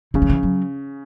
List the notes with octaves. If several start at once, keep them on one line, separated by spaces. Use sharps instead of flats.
C#3 E3
F#3
E3
F#3